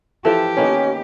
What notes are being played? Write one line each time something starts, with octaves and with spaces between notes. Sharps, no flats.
E3 F3 G4 A4 G5
D#3 A#3 B3 C#4